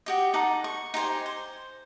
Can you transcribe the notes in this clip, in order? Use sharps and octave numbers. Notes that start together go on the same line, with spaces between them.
F#4 G4 D#5
D#4 A4 F#5 D6
C#6
D#4 G4 C5 G#5
C5